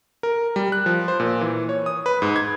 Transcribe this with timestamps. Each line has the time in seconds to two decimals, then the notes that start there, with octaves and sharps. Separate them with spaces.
0.23 A#4
0.56 G3
0.72 F#6
0.86 F3
1.08 C5
1.20 A#2
1.41 E3
1.69 C#5
1.86 D#6
2.06 B4
2.22 G#2
2.36 G#6